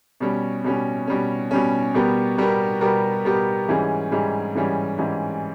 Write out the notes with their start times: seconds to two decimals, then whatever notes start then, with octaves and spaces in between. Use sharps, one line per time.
0.20 B2 G3 C#4
0.64 B2 G3 C#4
1.07 B2 G3 C#4
1.51 B2 G3 C#4
1.94 B2 G3 B3 G4 A#4
2.38 B2 G3 B3 G4 A#4
2.81 B2 G3 B3 G4 A#4
3.25 B2 G3 B3 G4 A#4
3.68 G#2 E3 G3 C#4 G#4
4.11 G#2 E3 G3 C#4 G#4
4.55 G#2 E3 G3 C#4 G#4
4.98 G#2 E3 G3 C#4 G#4